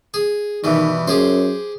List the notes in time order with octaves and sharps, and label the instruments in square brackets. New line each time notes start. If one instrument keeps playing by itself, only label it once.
[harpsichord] G#4
[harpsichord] G2 B2 E3 [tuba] D#3
[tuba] F#2 [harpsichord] G4 G#4 C5